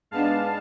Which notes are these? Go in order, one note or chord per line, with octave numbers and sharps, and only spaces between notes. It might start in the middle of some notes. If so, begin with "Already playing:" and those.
G#2 G#3 B3 D4 F5 A5